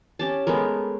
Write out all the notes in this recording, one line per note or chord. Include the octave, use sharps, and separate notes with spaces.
C#4 G4 A5
G#3 A3 B3 A#4